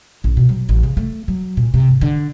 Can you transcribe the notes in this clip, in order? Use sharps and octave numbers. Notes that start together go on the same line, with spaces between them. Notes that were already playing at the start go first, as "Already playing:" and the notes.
A#1
B2
F#3
A1
C#3
A3
F#3
A#2
C3
G#1
D3